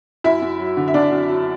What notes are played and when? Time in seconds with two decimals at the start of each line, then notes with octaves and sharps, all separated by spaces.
0.24 F#2 E4 E5
0.42 F#2
0.59 F#3
0.77 D3
0.88 E5
0.94 F#2 D4 D5
1.11 F#2
1.29 F#3